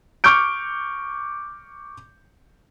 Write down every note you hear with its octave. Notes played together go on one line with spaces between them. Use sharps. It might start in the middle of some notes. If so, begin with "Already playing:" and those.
C#6 D6 F6 G6 D7